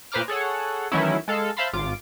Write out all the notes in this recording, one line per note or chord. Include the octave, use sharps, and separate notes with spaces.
A#2 B4 C5 A#5 D6 F6
G#4 A4 C#5 F#5
D#3 E3 F#3 A3 C#4 E4
G#3 A4 F5
C5 E5 F5 A5 B5 C6
G#1 F4 D6